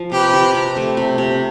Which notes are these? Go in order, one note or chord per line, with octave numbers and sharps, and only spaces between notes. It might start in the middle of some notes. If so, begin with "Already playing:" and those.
Already playing: F3
C3 G4 B4
F3
C3
A3
C3
C3